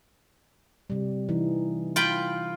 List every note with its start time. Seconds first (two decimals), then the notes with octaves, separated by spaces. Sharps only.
0.90 C3 G3
1.29 E3 D#4
1.96 F4 G5 B5